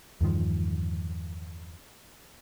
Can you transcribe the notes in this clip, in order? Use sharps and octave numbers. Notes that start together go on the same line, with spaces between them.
E2 G2 D#3 F3